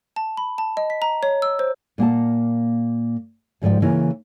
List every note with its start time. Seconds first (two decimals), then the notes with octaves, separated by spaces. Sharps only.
0.16 A5
0.37 B5
0.58 A5
0.77 D#5
0.90 B6
1.02 A#5
1.23 C#5
1.42 E6
1.59 C5
1.98 A#2 A#3 F#5 A5
3.62 D2 G#2 F3 D5 G5
3.82 C#3 E3 A#3 A#4